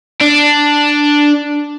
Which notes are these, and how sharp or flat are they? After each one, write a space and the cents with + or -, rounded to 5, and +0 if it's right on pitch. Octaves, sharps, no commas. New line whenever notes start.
D4 +0